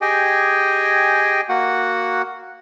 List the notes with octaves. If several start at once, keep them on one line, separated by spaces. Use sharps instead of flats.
G4 G#4 D#5 G5 G#5
A#3 F#4 F#5